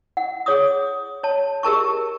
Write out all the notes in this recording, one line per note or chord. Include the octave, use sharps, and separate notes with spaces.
F#5
G#4 C#5 D6 D#6
C#5 A5
G4 G#4 A#4 A5 C#6